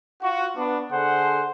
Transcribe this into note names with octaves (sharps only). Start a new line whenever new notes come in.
F4 F#4
B3 D4
D3 G#4 A4 C5 F#5